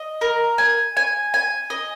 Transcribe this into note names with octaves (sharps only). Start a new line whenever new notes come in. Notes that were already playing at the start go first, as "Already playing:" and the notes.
Already playing: D#5
A#4
G#5
G#5
G#5
D#5